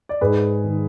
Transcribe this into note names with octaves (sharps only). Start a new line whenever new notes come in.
D5
G#2 G#4 B4
D#3